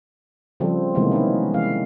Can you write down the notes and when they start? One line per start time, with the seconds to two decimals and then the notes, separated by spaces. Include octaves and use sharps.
0.60 C#3 F3 G3 C4 A4
0.95 C3 D#3 E3 G#3 A#3 B3
1.11 B3 C#4 D#4 E4
1.54 E3 G#3 F5